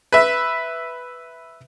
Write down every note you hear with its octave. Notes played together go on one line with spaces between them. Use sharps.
B4 E5